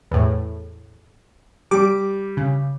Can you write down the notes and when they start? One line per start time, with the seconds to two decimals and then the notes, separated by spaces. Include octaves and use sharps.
0.11 E2 A2
1.71 G3 D6
2.37 C#3